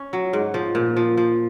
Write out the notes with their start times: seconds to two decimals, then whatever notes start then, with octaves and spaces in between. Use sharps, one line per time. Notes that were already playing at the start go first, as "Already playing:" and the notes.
Already playing: C#4
0.13 F#3
0.33 G#2
0.54 F3
0.75 A#2
0.97 F3
1.17 F3